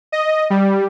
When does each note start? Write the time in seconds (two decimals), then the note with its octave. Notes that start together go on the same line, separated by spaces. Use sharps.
0.12 D#5
0.50 G3